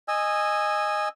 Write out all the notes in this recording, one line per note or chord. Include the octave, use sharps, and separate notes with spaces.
D#5 G#5 E6